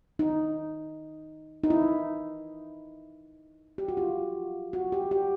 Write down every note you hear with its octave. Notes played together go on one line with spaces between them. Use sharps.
D#4
D#4
E4
G4
F#4
F4
F#4
G4
G4